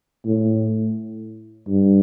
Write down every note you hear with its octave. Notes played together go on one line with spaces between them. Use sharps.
A2
G2